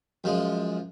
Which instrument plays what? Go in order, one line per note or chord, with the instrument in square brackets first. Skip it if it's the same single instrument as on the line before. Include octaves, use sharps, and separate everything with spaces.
[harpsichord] F#2 F3 G#3